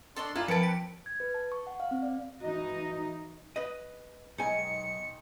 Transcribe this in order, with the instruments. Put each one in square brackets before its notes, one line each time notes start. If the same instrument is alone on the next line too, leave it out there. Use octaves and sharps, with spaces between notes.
[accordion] D4 D5 C6 [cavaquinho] A4 D#5 C#6
[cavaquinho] E4 [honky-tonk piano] F4 [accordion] D5 G#5 A#5
[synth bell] F3 [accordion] A#3 C4 [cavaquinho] B4 A5 [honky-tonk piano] C#7 D7
[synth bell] B6
[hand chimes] G#6
B4
A5
C#6
F#5
F5
C4
D5
[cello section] E3 D#4 D#5 [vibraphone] F#4
[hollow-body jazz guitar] B4 D#5
[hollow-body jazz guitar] B1 G#5 [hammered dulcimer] D#3 G#3 [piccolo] C#7